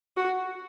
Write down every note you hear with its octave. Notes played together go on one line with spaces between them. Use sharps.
F#4